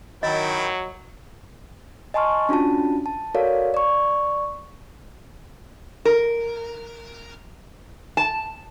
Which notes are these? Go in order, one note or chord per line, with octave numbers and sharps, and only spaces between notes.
D#3 F#3 E4 D#5 G5
D#5 G#5 A5 C6 C#6 F6
C#4 D4 F4 F#4 A5
A5
F#4 A4 A#4 C#5 D5 F5
D5 C#6
A#4
A5